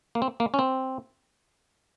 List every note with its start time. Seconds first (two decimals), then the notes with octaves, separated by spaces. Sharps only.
0.15 A#3
0.22 C4
0.40 A#3
0.54 C#4
0.59 C4